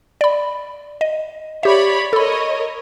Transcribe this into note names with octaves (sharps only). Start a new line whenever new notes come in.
D5 B5
D#5
G4 C#5 D5 E5 B5
A4 A#4 C#5 D#5 B5